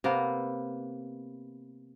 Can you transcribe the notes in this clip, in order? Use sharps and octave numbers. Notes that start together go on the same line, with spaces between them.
C3 A#3 B3